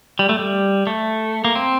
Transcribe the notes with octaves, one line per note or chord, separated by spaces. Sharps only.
G3
A3
G3
A3
A#3
C4